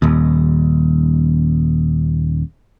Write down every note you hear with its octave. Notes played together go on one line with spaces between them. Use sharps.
D#1 D#2